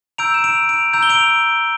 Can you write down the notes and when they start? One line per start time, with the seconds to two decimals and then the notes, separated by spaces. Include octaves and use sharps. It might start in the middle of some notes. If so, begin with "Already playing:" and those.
0.18 A#5 E6 G6 D7 F7
0.34 E7
0.44 D7 F7
0.69 D7 F7
0.93 A#5 E6 G6 F7
1.03 G7
1.10 D7 F7